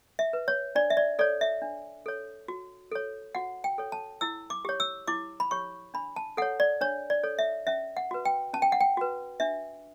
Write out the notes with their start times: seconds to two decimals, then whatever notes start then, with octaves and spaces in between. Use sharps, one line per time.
0.19 E5
0.33 B4
0.48 C#5
0.75 D4 D5
0.90 E5
0.97 D5
1.19 A4 C#5 D5
1.41 E5
1.62 D4
2.06 A4 C#5
2.48 F#4
2.92 A4 C#5
3.35 F#4 F#5
3.64 G5
3.78 A4 C#5
3.92 A5
4.21 E4 E6
4.50 D6
4.65 G4 C#5
4.80 E6
5.08 E4 D6
5.40 B5
5.51 G4 C#5 C#6
5.94 D4 B5
6.16 A5
6.37 A4 F#5
6.42 C#5
6.60 D5
6.81 D4 C#5
7.10 D5
7.23 A4 C#5
7.39 E5
7.67 C#4 E5
7.97 F#5
8.11 F#4 B4
8.25 G5
8.53 C#4 A5
8.62 G5
8.72 F#5
8.81 G5
8.97 F#4 B4
9.40 D4 E5